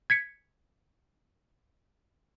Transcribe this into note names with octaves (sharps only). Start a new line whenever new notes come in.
G#6 B6 C#7